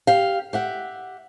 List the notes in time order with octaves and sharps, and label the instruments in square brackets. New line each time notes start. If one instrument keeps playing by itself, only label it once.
[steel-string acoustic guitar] G4 F5
G4 E5 F#5